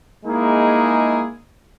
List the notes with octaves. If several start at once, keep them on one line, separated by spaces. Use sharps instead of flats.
G#3 A#3 D#4 E4 G#4